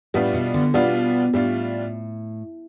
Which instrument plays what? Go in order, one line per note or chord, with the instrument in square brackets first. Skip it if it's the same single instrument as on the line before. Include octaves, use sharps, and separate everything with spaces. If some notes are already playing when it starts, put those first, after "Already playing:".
[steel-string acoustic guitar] A2 [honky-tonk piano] G3 B3 D4 F4
[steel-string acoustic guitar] B2
D3
[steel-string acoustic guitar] B2 [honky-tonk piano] G3 B3 D4 F4
[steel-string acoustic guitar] A2 [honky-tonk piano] G3 D4 F4